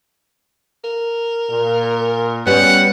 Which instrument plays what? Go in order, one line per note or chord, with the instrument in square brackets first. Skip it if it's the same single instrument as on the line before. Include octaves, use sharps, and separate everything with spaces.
[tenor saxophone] A#4
[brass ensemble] A#2
[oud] G3 B3 [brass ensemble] C#4 B4 [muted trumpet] F#5